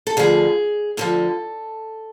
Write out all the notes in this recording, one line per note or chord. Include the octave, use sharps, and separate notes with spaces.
A4
D2 D3 F3 G#4
D2 D3 F3 A4